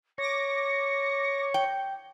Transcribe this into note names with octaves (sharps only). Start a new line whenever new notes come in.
C#5 D6 A#6 C#7
G5